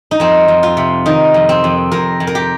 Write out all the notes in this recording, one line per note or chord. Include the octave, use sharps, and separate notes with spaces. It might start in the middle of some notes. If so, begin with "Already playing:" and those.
D#4
F2 C4
F2
F4
C3
D#3 D#4
F2
C4
F2
F2 A#4
F2
A#4
G4